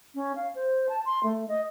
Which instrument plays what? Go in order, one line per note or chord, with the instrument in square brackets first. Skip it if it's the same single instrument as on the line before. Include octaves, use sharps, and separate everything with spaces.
[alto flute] C#4
F5
C5
A5
C6
A3
D#5